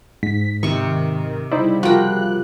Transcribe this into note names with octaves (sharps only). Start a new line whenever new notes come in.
G#2 B6
C3 D#3 C#6
C#3 G3 D#4 E4 C5 D5
F3 F#4 G4 A#4 G5 F#6